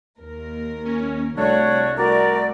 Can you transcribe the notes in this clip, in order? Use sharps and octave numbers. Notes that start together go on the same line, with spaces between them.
D#2 A#4
C#4
C2 A3 D4 F#4 C#5
F#4 A#4 D5